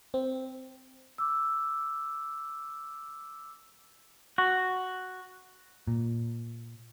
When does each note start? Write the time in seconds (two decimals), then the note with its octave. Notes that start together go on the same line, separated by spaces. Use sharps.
0.14 C4
1.18 D6 E6
4.38 F#4
5.87 A#2